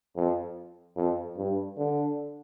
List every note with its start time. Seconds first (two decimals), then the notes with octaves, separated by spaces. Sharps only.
0.16 F2
0.97 F2
1.37 G2
1.78 D3